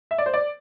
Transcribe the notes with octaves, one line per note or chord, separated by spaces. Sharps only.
E5
D5
C5
D5